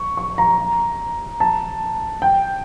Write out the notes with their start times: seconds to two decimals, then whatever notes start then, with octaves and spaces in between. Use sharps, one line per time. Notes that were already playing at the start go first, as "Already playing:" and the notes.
Already playing: C#6
0.17 C#6
0.38 A#5
1.40 A5
2.22 G5